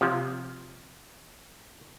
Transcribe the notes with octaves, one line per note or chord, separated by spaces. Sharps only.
C3 F3